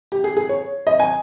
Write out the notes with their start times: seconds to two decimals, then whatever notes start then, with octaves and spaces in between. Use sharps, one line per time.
0.12 G4
0.24 G#4
0.37 G#4
0.49 C#5
0.87 D#5
1.00 G#5